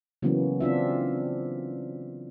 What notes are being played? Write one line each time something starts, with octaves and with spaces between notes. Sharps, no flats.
C#3 E3 F#3 A#3 B3 C#4
C4 D4 F4 E5